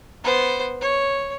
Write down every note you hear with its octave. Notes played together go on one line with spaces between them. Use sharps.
B3 C5
C#5